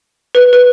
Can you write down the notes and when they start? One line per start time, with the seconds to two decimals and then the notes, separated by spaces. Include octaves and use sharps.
0.35 B4
0.53 B4